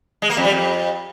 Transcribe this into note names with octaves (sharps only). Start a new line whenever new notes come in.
G#3
A#3
F2
G3
F2